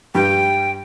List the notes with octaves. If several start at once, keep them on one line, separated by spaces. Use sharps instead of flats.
G2 G3 G5